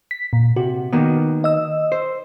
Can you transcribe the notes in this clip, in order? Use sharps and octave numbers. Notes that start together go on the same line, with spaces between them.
B6
A#2
C3 F#4
D#3 A#3 B3
D#5 E6
C5